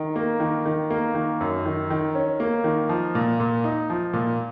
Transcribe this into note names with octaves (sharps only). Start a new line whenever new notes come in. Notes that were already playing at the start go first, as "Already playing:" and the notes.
Already playing: D#3
A#3
D#3
D#3
A#3
D#3
F#2
D#3
D#3
C#4
A#3
D#3
F3
A#2
A#2
D#4
F3
A#2